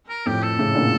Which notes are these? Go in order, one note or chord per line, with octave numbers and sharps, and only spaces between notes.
A#4
F2 A2 G4
A4
A2 C#3
A#2 D3